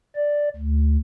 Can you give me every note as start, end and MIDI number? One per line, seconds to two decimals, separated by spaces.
0.16 0.49 74
0.56 0.97 38